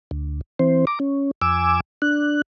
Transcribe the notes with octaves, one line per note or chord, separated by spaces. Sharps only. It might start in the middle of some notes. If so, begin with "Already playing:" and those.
D2
E3 C4 C5
A#5 D6
C#4
F2 G#5 D6 E6
D4 F#6